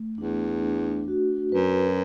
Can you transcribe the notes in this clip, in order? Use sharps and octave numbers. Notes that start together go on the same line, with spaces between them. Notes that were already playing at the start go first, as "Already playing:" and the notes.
Already playing: A3
E2 D4
D4
F#4
F#2 B4